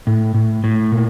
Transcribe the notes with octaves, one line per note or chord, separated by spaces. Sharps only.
A2
A2
A2
A#2